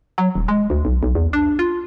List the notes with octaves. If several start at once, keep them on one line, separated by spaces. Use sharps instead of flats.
F#3
D#1
G#3
D2
B1
B1
E2
D4
F4